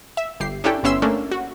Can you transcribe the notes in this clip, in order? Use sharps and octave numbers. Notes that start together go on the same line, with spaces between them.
E5
G1 G4 C7
C#4 D4 E4 G4 A4 G5
G1 B3 C#4 E5 C6 E6
A3 A#3 C#4 D4
F#4